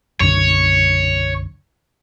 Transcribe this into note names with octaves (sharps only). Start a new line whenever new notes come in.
B1 F#2 D3 C#5